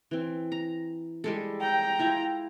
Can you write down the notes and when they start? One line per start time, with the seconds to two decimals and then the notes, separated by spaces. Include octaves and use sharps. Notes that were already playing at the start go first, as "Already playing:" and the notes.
0.11 E3 C4
0.52 A#5
1.24 G3 G#3 A4
1.60 G5 A#5
1.99 E4 F4